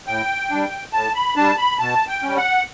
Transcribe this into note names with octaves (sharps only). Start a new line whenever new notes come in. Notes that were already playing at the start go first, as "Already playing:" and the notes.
A2 G5
G3 D4
A2 A5
B5
G3 D4 A5
B5
B2 A5
G5
G3 C#4
F#5